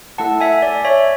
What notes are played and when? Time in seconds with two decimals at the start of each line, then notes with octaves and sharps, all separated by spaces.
0.18 A3 E4 A4 F#5 A5
0.40 E5 G#5
0.62 D5
0.85 C#5 E5